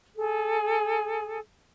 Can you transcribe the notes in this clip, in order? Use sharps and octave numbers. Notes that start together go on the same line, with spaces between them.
G#4 A4